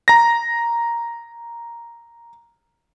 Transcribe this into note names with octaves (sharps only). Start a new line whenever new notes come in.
A#5 A#6